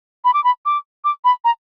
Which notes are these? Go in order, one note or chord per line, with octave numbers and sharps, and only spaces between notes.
B5
D6
B5
D6
D6
B5
A#5